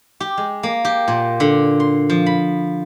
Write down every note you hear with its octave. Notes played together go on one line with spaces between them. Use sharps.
G4
G#3
A#3
G4
A#2
D3
C6
F3
B5